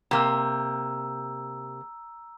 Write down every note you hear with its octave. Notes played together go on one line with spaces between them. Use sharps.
C3 A#3 A#5 E6